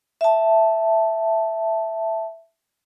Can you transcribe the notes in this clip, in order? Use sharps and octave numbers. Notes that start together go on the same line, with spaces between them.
E5 A5